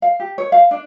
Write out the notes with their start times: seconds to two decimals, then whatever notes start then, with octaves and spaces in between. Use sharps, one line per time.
0.02 F5
0.20 G4
0.38 C#5
0.52 F5
0.71 D4